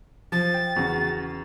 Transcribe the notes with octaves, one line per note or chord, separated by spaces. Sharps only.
F3 A6
G5
E2 C#3 F#4